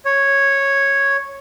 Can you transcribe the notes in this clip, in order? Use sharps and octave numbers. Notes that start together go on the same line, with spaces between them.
C#5